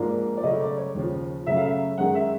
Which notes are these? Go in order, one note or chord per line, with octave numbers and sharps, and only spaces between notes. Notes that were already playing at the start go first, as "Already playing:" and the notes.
Already playing: G#2 F3 A#3 D4 F4
D5
C#3 F#3 A3 C#4 D#5
D5
C#5
D#2 C#3 F3
F#2 C#3 F#3 A3 E5
F5
E5
F#2 D#3 G#3 F#5
E5